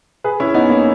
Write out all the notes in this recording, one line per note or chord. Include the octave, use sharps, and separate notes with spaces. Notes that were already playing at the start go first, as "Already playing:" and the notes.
G#4 B4
C#4 E4
B3 D#4
A#3 C#4